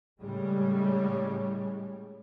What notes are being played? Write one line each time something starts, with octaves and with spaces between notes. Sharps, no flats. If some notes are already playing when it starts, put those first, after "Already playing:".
A2 C#3 G3 G#3